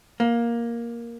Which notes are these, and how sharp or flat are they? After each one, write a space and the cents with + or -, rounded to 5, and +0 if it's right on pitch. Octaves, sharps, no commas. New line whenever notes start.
A#3 +10